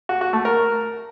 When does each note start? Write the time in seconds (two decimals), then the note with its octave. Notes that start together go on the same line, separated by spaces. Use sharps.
0.09 F#4
0.21 F#4
0.33 A3
0.45 A#4